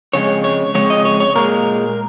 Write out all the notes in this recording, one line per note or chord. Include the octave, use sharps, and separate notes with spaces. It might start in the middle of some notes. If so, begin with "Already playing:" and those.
F2 C#3 G#3 C#5
C#5
F2 C#3 G#3 C#5
D#5
C#5
C#5
A#2 G#3 A#4